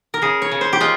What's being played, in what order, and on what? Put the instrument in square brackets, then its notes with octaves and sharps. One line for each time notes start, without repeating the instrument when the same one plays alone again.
[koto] A#4
C#3 G#4
C#5
C#3
C5
G4
G#3 F4